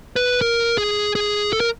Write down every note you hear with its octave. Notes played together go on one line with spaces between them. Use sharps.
B4
A#4
G#4
G#4
A4
A#4